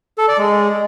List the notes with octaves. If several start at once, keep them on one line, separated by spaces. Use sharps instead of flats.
A4
D5
G#3